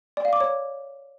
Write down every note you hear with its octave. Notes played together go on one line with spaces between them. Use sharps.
D5
F5
D6
C#5